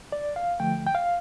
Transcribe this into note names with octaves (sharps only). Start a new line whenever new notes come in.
D5
F5
D3 F3 A3 G5
G5
F5